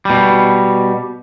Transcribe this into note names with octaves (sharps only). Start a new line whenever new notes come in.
B2 G3